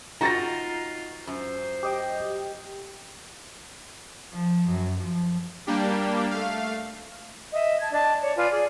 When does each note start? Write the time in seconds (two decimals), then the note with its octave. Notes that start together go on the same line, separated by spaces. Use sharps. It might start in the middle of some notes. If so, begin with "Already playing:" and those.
0.21 D#4 F4 F#4 A#5 A6 A#6
1.27 F#2 C5
1.83 G4 D#5 G5
4.33 F3
4.69 F#2
5.01 F3
5.67 G3 A#3 D4 G4
6.31 A3 F5
7.52 D#5 E5
7.79 A5 G#6
7.92 D4 D#5 A5
8.21 C#5 D5
8.36 F4 B4 D5 G#5
8.50 G#4 D5